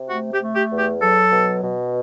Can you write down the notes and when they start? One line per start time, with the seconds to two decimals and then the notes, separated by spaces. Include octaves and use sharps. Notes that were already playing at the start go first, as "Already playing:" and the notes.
Already playing: C3
0.09 A3 F#4
0.32 G4
0.40 A3
0.56 G4
0.71 E2
0.79 G4
1.01 F#3 A4
1.32 B2
1.63 B2